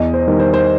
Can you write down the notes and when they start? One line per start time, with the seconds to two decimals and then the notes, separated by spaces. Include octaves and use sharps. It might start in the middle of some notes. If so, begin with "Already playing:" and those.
Already playing: E2 D#5
0.14 C5
0.27 D#3 G3
0.39 C5
0.54 C5